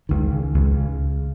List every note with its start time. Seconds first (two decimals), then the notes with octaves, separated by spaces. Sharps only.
0.09 C#2 D#3
0.32 C#3
0.54 C#2
0.77 C#3